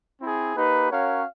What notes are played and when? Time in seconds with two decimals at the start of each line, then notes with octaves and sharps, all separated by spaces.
0.20 C4 E4 G#4
0.56 A#3 D#4 G4 B4
0.91 C#4 F#4 A#4 C#5 F5